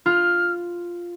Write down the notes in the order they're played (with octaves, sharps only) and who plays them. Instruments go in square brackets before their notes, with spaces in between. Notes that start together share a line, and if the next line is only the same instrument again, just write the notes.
[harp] F4 [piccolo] F6